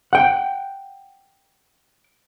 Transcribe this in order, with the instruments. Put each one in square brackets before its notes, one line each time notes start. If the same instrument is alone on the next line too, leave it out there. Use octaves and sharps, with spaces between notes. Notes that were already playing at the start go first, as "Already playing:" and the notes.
[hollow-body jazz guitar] F#5 G5